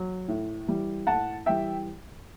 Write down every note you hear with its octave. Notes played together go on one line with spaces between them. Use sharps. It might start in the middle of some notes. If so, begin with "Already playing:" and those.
Already playing: F#3
A2
E3 G3
A2 F#5 A5
E3 G3 E5 G5